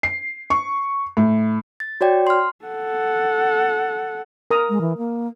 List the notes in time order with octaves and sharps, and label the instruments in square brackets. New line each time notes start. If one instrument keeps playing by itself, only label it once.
[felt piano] C7
C#6
A2
[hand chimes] A6
F#4 C#5 D5 G5
C6 F6
[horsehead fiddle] A4 F#5
[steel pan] A#4 A#5 D#6
[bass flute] G#3
E3
A#3